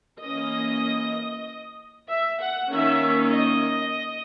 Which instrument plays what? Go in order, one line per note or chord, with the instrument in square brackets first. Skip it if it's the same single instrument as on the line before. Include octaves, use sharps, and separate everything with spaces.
[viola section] E3 A#3 C#4 D#5
E5
F#5
D#3 A#3 C#4 E5
D#5